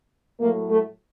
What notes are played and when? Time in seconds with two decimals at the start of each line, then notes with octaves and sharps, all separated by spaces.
0.39 A2 F#3 A3 A#3 A#4
0.69 A3 A4